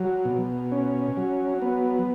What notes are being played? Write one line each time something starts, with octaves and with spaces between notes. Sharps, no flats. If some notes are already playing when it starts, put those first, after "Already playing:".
Already playing: F#3
B2
C#4
F#3
B3